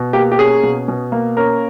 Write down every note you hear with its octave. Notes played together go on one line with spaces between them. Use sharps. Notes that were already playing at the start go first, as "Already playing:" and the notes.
Already playing: B2
A#3 G4
G4
C#4 G#4
B2
B2
A#3
C#4 A#4